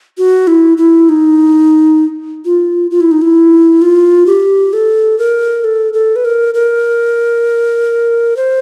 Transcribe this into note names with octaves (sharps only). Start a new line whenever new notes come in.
F#4
E4
E4
D#4
F4
F4
E4
D#4
E4
F4
G4
A4
A#4
A4
A4
B4
A#4
A#4
C5